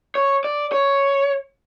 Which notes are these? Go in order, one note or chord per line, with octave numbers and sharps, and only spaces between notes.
C#5
D5
C#5